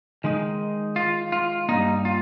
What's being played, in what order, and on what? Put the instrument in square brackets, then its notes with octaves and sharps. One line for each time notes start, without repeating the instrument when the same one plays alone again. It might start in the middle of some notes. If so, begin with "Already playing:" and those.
[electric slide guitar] D#3 G#3 D#4
F4
F4
G2 G3 A#3 D#4
F4